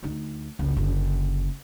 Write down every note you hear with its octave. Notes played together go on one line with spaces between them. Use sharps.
D2 D#4
F#1 C#2
F#1 D3